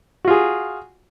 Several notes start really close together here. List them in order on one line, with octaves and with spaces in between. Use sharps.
F#4 F4 G#4